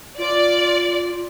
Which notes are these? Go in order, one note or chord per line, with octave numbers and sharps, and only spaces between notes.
F4 D5